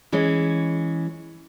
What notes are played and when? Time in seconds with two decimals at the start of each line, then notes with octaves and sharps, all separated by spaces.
0.12 E3 G#3 C#4